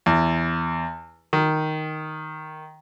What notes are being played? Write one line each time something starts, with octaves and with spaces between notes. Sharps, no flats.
E2
D#3